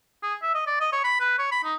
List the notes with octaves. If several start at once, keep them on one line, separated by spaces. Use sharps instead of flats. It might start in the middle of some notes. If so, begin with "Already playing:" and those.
G#4
E5
D#5
D5
D#5
C#5
B5
B4
C#5
B5
D#4